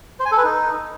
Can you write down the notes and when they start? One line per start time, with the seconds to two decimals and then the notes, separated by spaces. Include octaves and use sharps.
0.19 C5
0.26 G#5
0.32 A4
0.38 B4
0.44 D#4